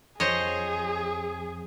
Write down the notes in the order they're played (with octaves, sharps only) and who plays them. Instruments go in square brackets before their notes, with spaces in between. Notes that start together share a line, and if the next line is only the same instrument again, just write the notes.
[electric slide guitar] F2 [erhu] G#4 [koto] C5 C#5 D#5